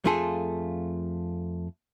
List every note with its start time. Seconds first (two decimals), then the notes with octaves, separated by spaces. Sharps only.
0.05 F2 A3 F4 G#4 A4